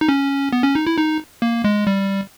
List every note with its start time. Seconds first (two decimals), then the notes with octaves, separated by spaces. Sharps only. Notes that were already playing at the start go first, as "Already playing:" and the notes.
0.01 D#4
0.08 C#4
0.53 B3
0.64 C#4
0.75 D#4
0.87 E4
0.97 D#4
1.42 A#3
1.64 G#3
1.87 G3